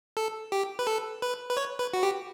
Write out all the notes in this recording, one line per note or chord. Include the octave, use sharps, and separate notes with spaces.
A4
G4
B4
A4
B4
B4
C#5
B4
F#4
G4